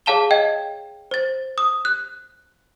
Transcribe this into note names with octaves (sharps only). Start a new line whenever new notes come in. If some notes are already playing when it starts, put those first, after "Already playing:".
G#4 C#5 F5 A5 E7 G7
D#5 G5 G#6
C5 A6
D#6
F#6